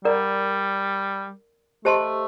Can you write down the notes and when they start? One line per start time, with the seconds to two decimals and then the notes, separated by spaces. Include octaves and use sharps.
0.05 G3 A#4 D5 F#5 A#5
1.85 A3 G4 C5 D#5 A5 C6